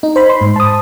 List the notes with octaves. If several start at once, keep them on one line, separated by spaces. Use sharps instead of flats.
D#4
C5 B5
C6
G#2
A5 D#6